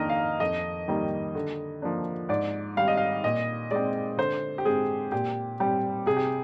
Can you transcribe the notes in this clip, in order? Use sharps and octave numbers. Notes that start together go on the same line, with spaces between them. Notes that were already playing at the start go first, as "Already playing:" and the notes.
Already playing: F2 D#3 A#3 D4 A#4 D#5
F5
F2 D#5
D#3 G3 A#3
D3
F3 A#3 D4
G#2 D5
D#3 G3 C4 F5
D#5
F5
A#2 D#5
G#3 C4 D5
D3 C5
G4
G#3 C4 G#4
A#2 G4
G3 C4 G4
C3 G#4
G4